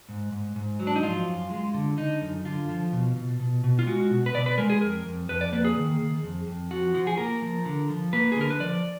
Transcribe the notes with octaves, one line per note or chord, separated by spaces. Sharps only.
G#2
G#2
G#2
F#3
D4
D#4
F3 F4
F#2
G#3
D3
D3 D#4
F#2
D3 F4
F3
B2
B2
B2
B2
F4
G#3 F#4
B2
B4
B2 D5
B4
G#3 A#4
G#4
F2 A#4
F2
F2 B4
D5
A#3 B4
G#4
D#3
D#3
F2
F2
F3 F#4
F3
G#4
A#3 A#4
F3
D3
F3
A#3 B4
G#4
D3
A#4
B4
F3 D5